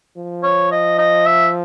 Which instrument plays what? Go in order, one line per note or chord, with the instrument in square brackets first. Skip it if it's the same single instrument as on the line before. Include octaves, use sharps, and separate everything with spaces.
[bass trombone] F3
[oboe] C#5
D#5
D#5
E5